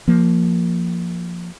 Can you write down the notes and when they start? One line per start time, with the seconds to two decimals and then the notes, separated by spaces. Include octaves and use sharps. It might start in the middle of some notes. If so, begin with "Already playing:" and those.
0.08 F3 A#3